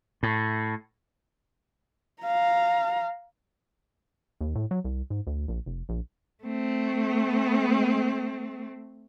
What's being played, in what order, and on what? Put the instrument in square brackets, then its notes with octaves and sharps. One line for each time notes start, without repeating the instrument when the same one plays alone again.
[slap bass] A2
[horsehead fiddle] F5 A#5
[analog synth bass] D#2
A2
F#3
C2
G#2
D2
A#1
F1
A#1
[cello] A3 C4